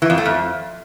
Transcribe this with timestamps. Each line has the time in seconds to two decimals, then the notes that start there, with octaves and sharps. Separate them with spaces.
0.02 E3
0.10 F2
0.18 A3
0.26 F2